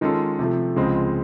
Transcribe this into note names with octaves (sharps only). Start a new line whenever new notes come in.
D#3 G#3 C#4 F4 A4
C3 F3 A3
C#2 C#3 F3 G#3 C4